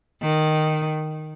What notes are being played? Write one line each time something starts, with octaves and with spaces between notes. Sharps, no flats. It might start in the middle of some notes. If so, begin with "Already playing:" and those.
D#3